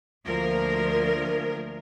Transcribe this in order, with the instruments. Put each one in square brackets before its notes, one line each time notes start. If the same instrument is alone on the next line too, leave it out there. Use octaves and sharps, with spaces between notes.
[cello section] D2 F3 A#3 A#4